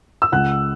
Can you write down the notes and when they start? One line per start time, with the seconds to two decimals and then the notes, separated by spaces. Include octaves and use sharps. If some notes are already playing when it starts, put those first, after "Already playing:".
0.22 E6
0.32 C#2 F#5 F#6